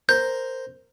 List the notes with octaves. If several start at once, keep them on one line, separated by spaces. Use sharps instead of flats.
A#4 C5 G6